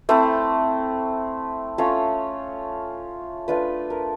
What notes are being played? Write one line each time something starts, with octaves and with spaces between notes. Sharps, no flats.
A3 C4 E4 C5
A3 C#4 F4 C#5
A3 D4 F4 B4
A#4